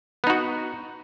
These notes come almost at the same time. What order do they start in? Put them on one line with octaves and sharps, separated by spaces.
B3 D#4 F#4